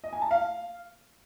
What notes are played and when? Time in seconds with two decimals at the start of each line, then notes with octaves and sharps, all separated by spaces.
0.04 D#5
0.13 G#5
0.22 A5
0.31 F5